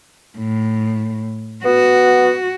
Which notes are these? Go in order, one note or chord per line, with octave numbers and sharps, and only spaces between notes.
A2
B3 F#4